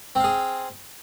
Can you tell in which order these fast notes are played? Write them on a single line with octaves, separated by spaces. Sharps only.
C4 F5 G#4